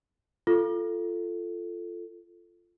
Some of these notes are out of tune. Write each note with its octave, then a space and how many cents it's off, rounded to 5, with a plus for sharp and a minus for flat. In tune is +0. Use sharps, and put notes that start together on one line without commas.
F4 -15 A4 +0